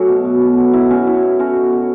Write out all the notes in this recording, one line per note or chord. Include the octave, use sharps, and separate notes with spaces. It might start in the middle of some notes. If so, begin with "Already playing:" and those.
Already playing: F#3 A3 C#4 F#4 A4
B2
B2
B2
F#3
B2 E4
B2 C#4 F#4
B2 E4
B2 C#4
A3 C#4 F#4
B2
B2